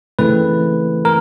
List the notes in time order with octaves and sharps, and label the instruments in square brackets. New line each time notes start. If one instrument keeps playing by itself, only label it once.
[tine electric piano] C#3 E3 A3 C4 B4
A#4